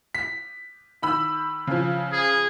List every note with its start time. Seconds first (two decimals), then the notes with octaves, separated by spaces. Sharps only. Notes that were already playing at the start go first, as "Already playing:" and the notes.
0.15 B6
1.02 D#3 B5 E6
1.67 C#3 F3
2.13 G#4